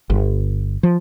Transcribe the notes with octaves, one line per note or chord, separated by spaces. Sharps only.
G1
F3